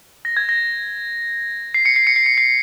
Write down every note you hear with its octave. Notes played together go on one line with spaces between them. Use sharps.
A#6
G#6
A#6
C7
C#7
C7
C#7
C7
C#7
C7